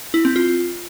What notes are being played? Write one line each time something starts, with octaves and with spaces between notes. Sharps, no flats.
E4
C4
F4